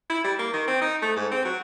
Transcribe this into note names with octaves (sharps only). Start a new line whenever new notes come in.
E4
G3
A#3
D#3
C4
D#4
A3
G#2
C4
F#3